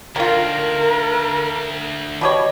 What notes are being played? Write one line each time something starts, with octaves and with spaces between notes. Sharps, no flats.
D2 D#3 F4 A#4
B2 G3 C#5 D#5